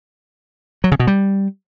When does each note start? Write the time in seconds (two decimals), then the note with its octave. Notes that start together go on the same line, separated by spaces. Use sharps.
0.84 F#3
0.92 C#3
1.00 B2
1.07 G3